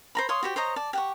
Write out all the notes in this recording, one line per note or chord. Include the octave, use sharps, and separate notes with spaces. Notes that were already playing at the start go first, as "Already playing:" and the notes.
C5 A#5 B5
C#5 F5 C6 D#6
F#4 G4 C5
C5 C#5 D#5 A#5
D5 A5
G4 F#5 C#6